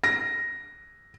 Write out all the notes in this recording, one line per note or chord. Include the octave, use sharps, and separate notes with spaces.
A#6